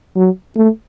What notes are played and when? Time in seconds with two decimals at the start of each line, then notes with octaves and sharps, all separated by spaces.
0.16 F#3
0.56 A3